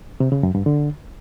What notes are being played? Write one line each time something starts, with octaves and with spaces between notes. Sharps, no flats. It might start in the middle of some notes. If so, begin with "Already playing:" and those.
C3
C#3
F#2
G2
D3